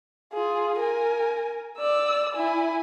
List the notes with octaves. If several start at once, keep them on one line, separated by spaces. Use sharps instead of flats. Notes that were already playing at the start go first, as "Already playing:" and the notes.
F4 G#4
A#4 G#5
D5 E6
E4 G#5